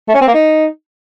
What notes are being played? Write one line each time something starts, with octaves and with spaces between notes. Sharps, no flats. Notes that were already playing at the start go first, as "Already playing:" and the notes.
A3
C#4
C4
A#3
D#4